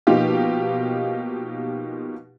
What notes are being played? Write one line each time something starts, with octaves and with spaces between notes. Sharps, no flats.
B2 F3 A#3 D#4 F4 G4